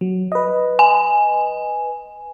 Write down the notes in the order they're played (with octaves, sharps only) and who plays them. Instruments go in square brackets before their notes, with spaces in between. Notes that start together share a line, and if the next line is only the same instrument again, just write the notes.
[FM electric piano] F#3
B4 D#5
[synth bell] G#5